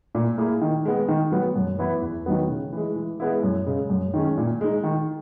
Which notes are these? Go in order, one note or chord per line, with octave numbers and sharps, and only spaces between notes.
A#2
A#3 E4 G#4
D#3
G#3 B3
D#3
F#3 B3
F#2
E3 B3 E4
E2
D#3 F#3 B3
C#3
E3 G#3
E3
G#3 B3 E4
F#2
C#3 G#3
F#2
D#3 G#3 C#4
A#2
G#3 D#4
D#3